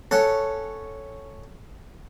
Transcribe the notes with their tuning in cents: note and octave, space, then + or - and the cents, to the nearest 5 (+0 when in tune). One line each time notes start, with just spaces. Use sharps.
C#4 +0 A4 +0 F#5 +0